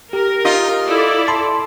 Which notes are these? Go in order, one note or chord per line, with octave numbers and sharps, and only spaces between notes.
G4 A#4
D#4 F4 D#5
E4 A4 D5
A5 B5 C6